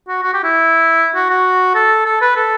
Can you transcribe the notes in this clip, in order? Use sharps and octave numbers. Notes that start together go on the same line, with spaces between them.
F#4
F#4
G4
E4
F#4
F#4
A4
A4
B4
A4